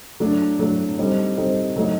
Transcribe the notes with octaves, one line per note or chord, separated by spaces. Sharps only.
F#3 A3 D4
F#3 A3 D4
G3 C4 D#4 A4
G3 C4 D#4 A4
F#3 A3 D#4